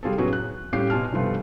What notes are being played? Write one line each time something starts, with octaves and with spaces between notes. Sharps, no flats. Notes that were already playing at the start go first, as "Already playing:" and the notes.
G3 F4 G#4 A4
A2 F#3 B3 C#4 F#4 G#4
F#6
A2 G3 C#4 G4 F5 C7
B2 F4 G#5 A5 F6
G2 B2 F3 G3 A3 F4